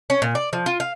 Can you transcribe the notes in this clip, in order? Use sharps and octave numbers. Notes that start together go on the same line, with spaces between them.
C#4
A#2
D5
F3
F4
F5